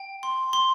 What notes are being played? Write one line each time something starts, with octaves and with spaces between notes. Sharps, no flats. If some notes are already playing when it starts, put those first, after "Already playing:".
Already playing: G5
C6
C6